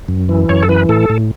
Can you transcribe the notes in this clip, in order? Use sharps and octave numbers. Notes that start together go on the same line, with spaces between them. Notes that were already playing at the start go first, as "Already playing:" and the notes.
F#2
E3
F#2 C#5
A4
E3 B4
A2 A4
A2